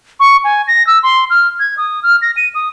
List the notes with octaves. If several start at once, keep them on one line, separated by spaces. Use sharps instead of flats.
C#6
G#5
A#6
E6
C6
F6
G#6
D#6
F6
A#6
D#7
D#6